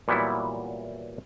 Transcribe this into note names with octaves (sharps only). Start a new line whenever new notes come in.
A#2 E3 F#3 G3 B3 E4